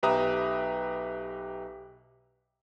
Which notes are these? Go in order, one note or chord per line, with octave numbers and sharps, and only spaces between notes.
B1 G4 B4 E5 A#5 D#6